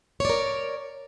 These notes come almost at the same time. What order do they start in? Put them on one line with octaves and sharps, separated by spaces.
C#5 D5 A#4